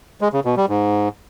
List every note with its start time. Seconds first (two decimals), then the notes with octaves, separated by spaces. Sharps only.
0.21 G#3
0.33 C#3
0.45 B2
0.57 G3
0.69 G#2